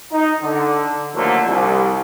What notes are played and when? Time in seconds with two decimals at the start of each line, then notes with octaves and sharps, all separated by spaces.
0.12 D#4
0.42 D3
1.15 D#2 D3 F3 F#3 A3 A#3
1.45 C2